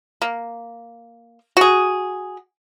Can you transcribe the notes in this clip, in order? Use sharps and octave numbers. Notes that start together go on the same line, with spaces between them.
A#3
F#4 G#4